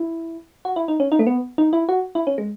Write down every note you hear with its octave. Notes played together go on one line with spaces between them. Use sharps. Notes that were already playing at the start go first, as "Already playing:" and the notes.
Already playing: E4
F#4
E4
D#4
C#4
D#4
A3
B3
D#4
E4
F#4
E4
C#4
G#3